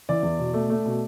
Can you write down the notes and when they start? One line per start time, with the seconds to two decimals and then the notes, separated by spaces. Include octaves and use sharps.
0.09 E3 D5
0.23 E2
0.39 B2
0.54 A3
0.70 A3
0.85 B2